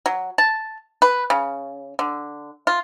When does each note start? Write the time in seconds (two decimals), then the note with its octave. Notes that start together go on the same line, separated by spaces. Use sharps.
0.06 F#3
0.38 A5
1.02 B4
1.30 C#3
1.99 D3
2.67 F4